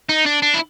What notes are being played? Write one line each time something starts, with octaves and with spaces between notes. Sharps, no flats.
D#4
D4
D4
E4